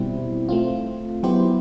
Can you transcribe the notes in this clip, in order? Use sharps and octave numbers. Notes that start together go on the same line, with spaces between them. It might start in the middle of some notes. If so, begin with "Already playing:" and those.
Already playing: B2 G3 C4 E4
A3 C4 F4
F#3 B3 E4 G4 C5